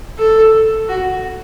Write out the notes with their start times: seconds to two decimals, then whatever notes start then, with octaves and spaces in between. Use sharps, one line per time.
0.19 A4
0.89 F#4